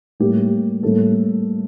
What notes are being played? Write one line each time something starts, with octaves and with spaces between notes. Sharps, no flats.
A2 G3 A#3 G4
A2 G3 A#3 A4